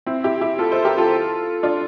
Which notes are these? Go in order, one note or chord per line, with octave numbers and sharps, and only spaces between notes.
C4 E4
E4 G4
E4 G4
F4 A4
A4 C5
G4 A#4
F4 A4
D4 F4